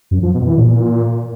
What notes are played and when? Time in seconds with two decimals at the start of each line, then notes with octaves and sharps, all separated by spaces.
0.11 F#2
0.23 F3
0.34 B2
0.46 E3
0.58 A#2